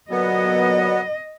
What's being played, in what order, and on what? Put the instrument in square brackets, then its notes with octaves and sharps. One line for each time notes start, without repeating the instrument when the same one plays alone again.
[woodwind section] A#2 D3 F#3 [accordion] B3 [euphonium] F#4 [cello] D#5